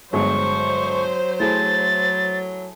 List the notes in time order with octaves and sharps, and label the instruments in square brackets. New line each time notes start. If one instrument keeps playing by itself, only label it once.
[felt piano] G1 G#3 [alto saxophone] F#3 [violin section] C5 [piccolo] C#6
[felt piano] A3 E4 G#4 [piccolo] A6